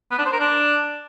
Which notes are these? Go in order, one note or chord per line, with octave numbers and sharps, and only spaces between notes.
B3
D4
C5
A#4
D4